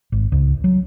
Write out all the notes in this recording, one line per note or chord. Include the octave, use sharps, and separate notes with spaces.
G#1
C#2
F#3